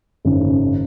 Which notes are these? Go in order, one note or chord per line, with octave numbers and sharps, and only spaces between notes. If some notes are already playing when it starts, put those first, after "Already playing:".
G#1 F#2 C#3